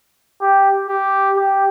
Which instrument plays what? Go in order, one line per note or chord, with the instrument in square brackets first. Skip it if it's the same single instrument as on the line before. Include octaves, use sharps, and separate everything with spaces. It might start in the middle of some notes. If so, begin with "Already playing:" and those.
[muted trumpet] G4
[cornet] G4
[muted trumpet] G4